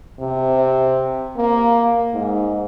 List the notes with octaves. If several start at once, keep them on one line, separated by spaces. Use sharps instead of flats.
C3
A#3
G#2